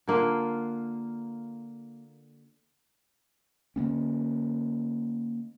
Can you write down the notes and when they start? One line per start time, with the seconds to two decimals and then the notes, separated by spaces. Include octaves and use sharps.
0.07 D3 A#3 F4
3.76 D3 F#3 A#3 C#4